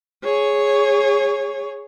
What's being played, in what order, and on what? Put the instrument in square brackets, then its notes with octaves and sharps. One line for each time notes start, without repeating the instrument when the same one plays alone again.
[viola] G#4 C#5